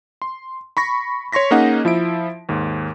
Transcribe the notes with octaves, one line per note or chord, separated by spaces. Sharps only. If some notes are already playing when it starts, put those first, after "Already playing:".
C6
B5 C#6 A#6
C#5 C6 C#6 A#6 B6
A#3 C#4 D#4 G#4 D#5 F#5
F3 E4 E5 D7
D#2 G#2